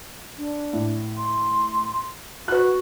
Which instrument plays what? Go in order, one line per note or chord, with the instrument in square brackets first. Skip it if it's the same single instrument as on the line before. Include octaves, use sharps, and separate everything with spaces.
[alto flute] D4
[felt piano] A2
[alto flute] C6
[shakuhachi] F#4 [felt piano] B4 F#6 [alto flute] F#5